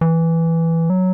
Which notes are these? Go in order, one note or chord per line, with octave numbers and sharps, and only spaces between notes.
E3
F#3